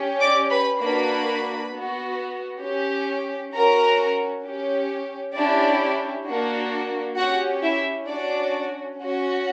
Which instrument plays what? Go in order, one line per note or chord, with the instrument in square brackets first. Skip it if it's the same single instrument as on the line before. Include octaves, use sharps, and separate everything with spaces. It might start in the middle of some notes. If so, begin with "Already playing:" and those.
Already playing: [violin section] C#4 G4
D5 D6
B4 B5
A#3 D4 F#4 B4 B5
B3 F#4
C#4 G4
C#4 F#4 A#4 A#5
C#4 G4
C#4 D4 E4 G4 D5
A#3 D4 F#4
C#4 F#4 G4 F#5
E4 E5
C#4 D4 F#4 D5
C#4 F#4